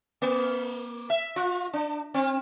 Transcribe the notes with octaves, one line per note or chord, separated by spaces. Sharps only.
A#3
E5
F4
D4
C4